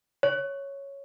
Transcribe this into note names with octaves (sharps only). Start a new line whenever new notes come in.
C#5